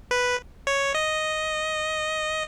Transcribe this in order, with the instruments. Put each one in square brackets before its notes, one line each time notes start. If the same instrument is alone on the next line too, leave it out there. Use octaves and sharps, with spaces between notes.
[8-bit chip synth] B4
C#5
D#5